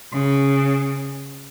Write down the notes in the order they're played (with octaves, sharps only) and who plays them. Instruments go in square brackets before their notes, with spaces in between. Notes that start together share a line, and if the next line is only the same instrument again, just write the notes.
[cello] C#3